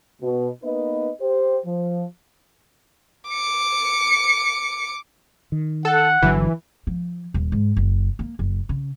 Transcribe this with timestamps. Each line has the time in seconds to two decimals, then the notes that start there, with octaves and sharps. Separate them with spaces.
0.22 B2
0.64 A#3 B3 D#4 B4 D#5
1.21 G4 C5
1.66 F3
3.30 D6 C#7
5.52 D#3
5.85 A4 F#5
6.22 G1 D3 E3 F#3
6.87 F3
7.34 D#1
7.52 G#2
7.77 F#1
8.19 A#3
8.39 F#1
8.69 C#3